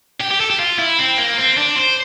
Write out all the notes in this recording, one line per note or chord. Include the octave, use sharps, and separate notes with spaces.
G4
G4
A4
G4
F4
E4
C4
A#3
C4
D4
C5